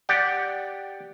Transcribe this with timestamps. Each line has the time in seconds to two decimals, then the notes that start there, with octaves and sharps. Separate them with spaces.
0.09 G4 D5 F#5 G5